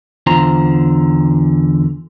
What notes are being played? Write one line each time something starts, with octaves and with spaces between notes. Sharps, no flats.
E2 D3 F4 C5 A#5